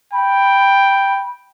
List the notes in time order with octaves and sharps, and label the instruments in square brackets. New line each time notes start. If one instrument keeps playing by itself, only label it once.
[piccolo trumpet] G5 [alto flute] B5